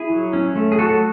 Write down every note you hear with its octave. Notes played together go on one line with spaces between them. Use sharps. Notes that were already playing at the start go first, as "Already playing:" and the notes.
Already playing: E4 G#4
F#3
C#4
A3
G#4
F#3 F#4 A4